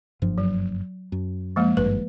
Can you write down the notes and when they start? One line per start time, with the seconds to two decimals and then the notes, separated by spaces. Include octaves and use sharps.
0.22 F#1 G2 F3
0.38 F#3
1.12 F#2
1.56 F3 G#3 A#3
1.77 G#1 G2 B4